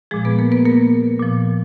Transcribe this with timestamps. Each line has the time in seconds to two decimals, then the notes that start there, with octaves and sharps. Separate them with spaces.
0.11 A#2 F3 G#3 G#4
0.25 B3 B4
0.39 A#3 A#4
0.52 B3 B4
0.65 A#3 A#4
1.19 A#2 F3